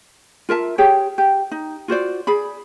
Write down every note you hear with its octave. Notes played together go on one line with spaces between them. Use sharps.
F4 A#4 E5 A5
G4 G#4 C#5 G5
G4
D#4
F4 F#4 C5 D5
G#4 D5 B5